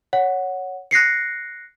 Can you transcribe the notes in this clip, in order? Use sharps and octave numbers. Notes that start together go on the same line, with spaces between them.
C#5 F#5
F#6 A#6 C7 C#7